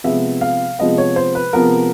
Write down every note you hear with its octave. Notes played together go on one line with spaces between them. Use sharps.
C3 F3 G#3 B3 E5
F5
C3 F3 G#3 B3 D#5
C#5
C5
B4
C3 F3 G#3 B3 A#4